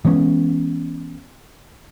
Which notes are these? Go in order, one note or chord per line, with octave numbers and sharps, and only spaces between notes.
E3 G#3 B3 C#4